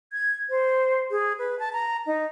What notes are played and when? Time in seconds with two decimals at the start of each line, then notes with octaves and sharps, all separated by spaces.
0.13 G#6
0.50 C5
1.11 G#4
1.39 B4
1.59 A5
1.73 A#5
2.07 D#4